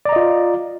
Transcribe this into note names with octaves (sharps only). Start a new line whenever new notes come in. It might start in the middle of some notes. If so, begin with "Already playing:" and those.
F4 D5 D#5 A#5